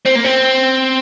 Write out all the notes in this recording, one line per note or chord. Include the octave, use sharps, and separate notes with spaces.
C4
A#3
C4